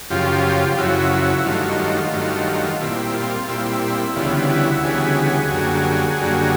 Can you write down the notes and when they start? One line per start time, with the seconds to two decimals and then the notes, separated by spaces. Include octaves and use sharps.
0.10 F#2 C#3 F3 F4 G4
0.78 F#2 C#3 F3 E4 F#4
1.12 E4 F#4
1.46 G2 D#3 F#3 A3 F4
1.62 F4
1.79 F4
1.96 F4
2.13 G2 D#3 F#3 A3
2.81 A#2 G3 C4 E4
3.15 F4
3.48 A#2 G3 C4 E4
4.16 D2 C#3 E3 G3 B3 F4
4.50 E4 F#4
4.83 D2 C#3 E3 G3 B3 F#4 G#4
5.51 F#2 D3 G3 A#3
6.19 F#2 D3 G3 A#3